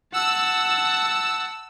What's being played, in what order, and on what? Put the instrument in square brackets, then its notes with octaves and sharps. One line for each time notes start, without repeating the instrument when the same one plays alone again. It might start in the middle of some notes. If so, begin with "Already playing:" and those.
[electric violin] F#5 A5 [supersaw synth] E6